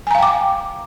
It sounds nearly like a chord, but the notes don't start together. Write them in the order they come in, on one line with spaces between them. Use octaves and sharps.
G#5 A#5 F5 G5 D6